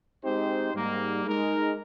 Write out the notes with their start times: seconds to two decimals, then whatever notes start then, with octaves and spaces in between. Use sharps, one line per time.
0.23 G#3 C4 D#4 G4 C5
0.73 G#2 G3 A#3
1.24 G#3 D#4 A#4